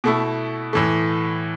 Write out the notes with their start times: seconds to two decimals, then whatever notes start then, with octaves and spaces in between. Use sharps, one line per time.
0.04 B2 A3 E4
0.73 A2 E3 A3